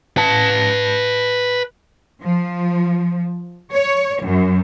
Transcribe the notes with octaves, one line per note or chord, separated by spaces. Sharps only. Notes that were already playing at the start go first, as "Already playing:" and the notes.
B4 A5
F3
C#5
F#2